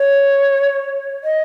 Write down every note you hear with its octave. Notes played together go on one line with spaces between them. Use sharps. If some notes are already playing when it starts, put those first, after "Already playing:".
Already playing: C#5
D#5